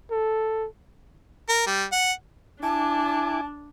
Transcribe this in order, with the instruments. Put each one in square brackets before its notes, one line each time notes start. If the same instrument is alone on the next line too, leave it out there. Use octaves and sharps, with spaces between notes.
[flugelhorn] A4
[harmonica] A#4
G3
F#5
[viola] D4 [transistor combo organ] E4 G#5 D6 [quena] A5